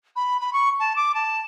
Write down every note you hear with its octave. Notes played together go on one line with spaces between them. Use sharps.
B5
B5
C#6
A5
D6
A5